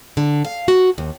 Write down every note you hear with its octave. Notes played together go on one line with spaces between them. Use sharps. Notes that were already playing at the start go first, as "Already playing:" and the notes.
D3
F5
F#4
D#2